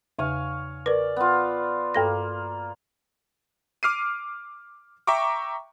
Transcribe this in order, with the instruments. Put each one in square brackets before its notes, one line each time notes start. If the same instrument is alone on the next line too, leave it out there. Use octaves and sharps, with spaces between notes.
[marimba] E2 C#3 [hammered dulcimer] C#5 F5 G#5
[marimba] A#4 B4 [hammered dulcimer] D5
[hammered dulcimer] B3 F4
[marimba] G2 A4 A#6 [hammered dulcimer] A#3
[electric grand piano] D6 F6 C7 D#7
E5 G5 A#5 C#6 D6